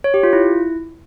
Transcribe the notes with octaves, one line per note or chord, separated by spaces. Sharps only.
C#5
G4
F4
E4